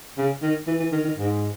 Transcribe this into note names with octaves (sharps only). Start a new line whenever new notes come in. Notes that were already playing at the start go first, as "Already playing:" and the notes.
C#3
D#3
E3
E3
D#3
D#3
G#2